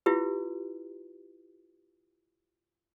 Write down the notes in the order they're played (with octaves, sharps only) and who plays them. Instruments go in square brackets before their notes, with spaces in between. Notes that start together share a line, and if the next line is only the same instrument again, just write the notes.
[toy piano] E4 F4 G4 B4